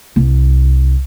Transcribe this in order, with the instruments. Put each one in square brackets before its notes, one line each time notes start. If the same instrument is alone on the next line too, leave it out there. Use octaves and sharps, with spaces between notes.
[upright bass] C2